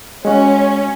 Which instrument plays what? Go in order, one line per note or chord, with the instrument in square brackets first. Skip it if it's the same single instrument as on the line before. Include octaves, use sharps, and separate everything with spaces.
[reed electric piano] G#3 F#4 [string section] C#4